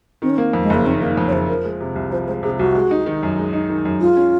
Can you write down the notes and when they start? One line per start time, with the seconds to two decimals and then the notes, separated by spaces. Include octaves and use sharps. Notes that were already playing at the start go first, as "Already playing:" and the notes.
0.22 D#3 C4
0.30 C#4
0.37 A#3 C4
0.53 F2
0.62 G#3
0.70 F#1 A#3
0.85 D#3 C4
1.01 A#3 D#4
1.17 F2
1.28 C#5
1.32 F#1 C5
1.48 F3 A#4
1.64 G#3
1.81 C3
1.95 C2
2.11 F3 C5
2.27 G#3 C5
2.43 C3 G#4
2.59 C2 F#4
2.75 G#3
2.91 D#4
3.06 D#3
3.23 F#2
3.38 G#3
3.53 D#4
3.69 D#3
3.85 F#2
4.00 G#3 F4
4.17 C#4